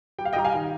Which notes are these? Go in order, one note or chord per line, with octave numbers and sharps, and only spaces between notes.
G3 G5
F5
D#5 G5
G3 A#5
F5 G#5
D#3